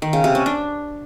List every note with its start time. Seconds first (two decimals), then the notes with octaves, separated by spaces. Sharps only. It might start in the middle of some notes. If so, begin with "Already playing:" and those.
0.02 D#3
0.13 C#3
0.24 C3
0.35 C#4
0.46 D4